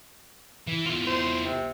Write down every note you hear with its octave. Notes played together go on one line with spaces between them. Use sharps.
E3
E2 F4
C5
C3